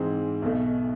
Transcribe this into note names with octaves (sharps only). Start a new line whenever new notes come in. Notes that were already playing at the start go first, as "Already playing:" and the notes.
Already playing: G#2 E3 G#3 C4
B1 B2 A3